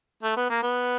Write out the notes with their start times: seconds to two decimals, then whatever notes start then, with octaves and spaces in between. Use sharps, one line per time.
0.23 A3
0.37 B3
0.50 A#3
0.62 B3